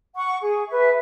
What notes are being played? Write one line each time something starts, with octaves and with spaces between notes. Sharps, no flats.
F#5 C#6
G#4
B4 E5